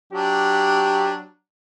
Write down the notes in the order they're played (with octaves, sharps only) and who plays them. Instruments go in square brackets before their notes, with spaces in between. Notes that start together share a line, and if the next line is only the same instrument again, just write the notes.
[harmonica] F#3 D4 [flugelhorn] G4